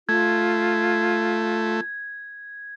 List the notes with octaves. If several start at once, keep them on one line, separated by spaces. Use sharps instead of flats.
A3 F4 G#6